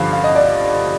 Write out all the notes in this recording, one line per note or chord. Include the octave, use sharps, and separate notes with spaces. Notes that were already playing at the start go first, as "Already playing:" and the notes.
Already playing: G2 D3 F3 F5
F5
D#5
D5